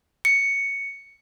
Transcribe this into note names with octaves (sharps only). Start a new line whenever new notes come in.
C#7